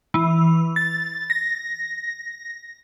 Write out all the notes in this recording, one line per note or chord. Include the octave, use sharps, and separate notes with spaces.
E3
A6
A#6